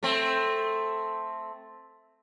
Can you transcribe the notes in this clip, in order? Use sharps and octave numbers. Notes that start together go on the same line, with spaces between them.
A3 C4